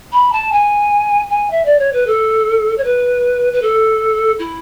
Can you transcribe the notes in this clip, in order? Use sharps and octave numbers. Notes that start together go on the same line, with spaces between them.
B5
A5
G#5
G#5
E5
D5
C#5
B4
A4
C#5
B4
B4
A4
E4